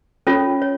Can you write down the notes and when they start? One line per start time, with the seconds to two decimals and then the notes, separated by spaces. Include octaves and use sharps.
0.27 C#4 F4 A4 C#5
0.62 C#5